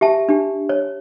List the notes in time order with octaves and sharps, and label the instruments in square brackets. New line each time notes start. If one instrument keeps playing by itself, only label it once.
[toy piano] G4 E5 A5
D4 G4
C#5